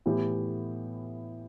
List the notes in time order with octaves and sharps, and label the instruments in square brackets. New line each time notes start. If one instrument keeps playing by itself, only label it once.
[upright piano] A2 E3 B3 E4 G4